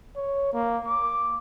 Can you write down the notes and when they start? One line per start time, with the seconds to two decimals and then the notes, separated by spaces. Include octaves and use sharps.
0.16 C#5
0.53 A#3
0.88 D6